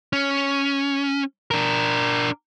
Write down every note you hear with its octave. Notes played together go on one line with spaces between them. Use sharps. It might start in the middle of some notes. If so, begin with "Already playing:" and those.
C#4
D4 A#4